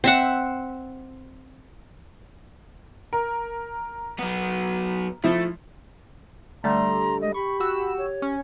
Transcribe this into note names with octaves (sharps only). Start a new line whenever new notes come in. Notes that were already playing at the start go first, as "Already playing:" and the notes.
C4 E5 F#5
A#4
F#3 B3
F3 A3 E4
D3 G3 A3 A#5 C6
G#3 D#5
G4 B5 C#6
F#4 E6
C#5
C#4